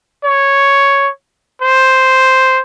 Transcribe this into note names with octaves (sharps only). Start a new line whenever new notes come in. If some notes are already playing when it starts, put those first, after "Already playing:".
C#5
C5